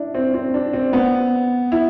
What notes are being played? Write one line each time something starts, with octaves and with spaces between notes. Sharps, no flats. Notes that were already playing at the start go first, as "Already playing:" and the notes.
Already playing: D4 E4
C4
C4
D4
C4
B3
E4